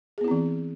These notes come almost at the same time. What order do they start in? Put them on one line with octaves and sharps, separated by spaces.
G#4 B3 E4 C4 E3